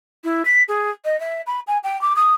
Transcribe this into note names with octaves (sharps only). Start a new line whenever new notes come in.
E4
B6
G#4
D#5
E5
B5
G#5
G5
D6
D#6